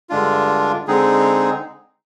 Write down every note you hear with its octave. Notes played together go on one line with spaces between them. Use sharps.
G2 D3 G#3 D4 F4
D3 G#3 C4 D#4 G#4